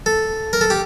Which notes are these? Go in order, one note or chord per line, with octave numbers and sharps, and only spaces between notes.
A4
A#4
A4
G4